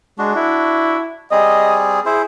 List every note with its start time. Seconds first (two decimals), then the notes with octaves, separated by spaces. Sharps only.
0.18 G#3 D4 F#4
0.35 E4
1.31 G3 C4 G#4 D#5
2.06 E4 G#4 C5